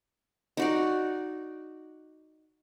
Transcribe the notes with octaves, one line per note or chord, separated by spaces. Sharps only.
D#4 F#4 D5